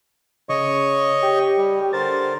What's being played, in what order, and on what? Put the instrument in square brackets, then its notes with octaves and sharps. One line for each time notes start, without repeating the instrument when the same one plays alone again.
[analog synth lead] C#3 [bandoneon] C#5 D#5 C#6
[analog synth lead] G4
[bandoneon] G3
[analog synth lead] G4
[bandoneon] D3 A#4 C5 [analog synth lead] A6